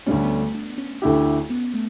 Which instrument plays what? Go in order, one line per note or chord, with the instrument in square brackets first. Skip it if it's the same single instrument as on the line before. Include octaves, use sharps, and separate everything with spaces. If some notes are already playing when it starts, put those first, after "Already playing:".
[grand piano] D2 D3 G3 C#4 [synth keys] A3
[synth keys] B3
A3
D4
B3
C#4
[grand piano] D2 D3 A3 E4 G4
[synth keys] B3
A3